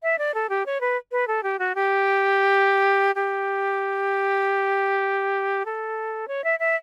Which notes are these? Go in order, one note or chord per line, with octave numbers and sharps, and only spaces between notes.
E5
D5
A4
G4
C#5
B4
B4
A4
G4
F#4
G4
G4
A4
C#5
E5
E5